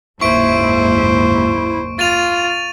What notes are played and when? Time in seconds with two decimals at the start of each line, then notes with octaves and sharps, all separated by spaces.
0.21 F#1 D#2 G#2 E4 C5 C#6 D7
1.99 F4 A6 D#7 F7